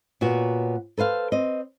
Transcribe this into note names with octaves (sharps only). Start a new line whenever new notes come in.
A#2 B3 F#4 C#5
A4 B4 C5 F5
C4 D#5